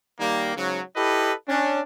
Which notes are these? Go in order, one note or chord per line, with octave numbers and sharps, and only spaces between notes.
D#3 G3 A#3
G#2 C#3 F#3
E4 G4 A4 B4 D#5
C#4 D4